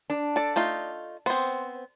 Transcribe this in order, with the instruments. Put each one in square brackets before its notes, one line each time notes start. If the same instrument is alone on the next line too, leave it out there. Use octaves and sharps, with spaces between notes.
[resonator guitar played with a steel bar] D4
[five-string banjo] A4 D5
A3 D#4 F4
[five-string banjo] B3 C4 [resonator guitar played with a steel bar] C5